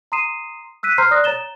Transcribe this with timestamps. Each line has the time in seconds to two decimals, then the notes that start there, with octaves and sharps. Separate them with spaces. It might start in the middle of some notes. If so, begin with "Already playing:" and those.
0.12 A#5 C6 D#6 C7 D#7 E7
0.83 E6 F#6 B6 D#7
0.98 C5 A#5 C6 F6 G6 C7
1.11 D5 D#6 F#6 A#6
1.24 C#5 A#5 A6 E7 G7